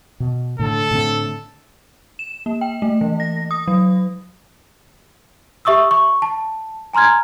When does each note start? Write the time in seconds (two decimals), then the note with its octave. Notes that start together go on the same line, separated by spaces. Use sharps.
0.20 B2
0.59 A2 D3 A4
0.91 A2 D3 C4
2.19 E7
2.46 A#3
2.61 G5
2.82 A3
3.01 E3
3.20 A#6
3.51 D#6
3.68 F#3
5.65 G4 E5 C#6 D#6 E6
5.91 C#6
6.22 A5
6.93 G#5 A#5 C6 F6 G#6